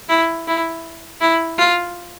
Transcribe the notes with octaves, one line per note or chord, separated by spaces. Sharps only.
E4
E4
E4
F4